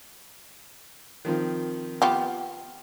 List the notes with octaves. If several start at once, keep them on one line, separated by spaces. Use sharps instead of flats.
D#3 F3 C4
B3 F4 G4